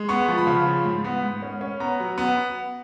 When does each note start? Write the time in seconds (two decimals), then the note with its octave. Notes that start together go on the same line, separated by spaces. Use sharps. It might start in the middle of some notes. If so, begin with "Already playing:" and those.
Already playing: G#3
0.09 B3 C#6
0.28 F3
0.38 B5
0.47 C#3
0.66 F3
0.85 G#2
1.04 B3
1.23 G#2
1.43 C#4
1.61 C#4
1.80 B3 A#5
2.00 F#3
2.18 B3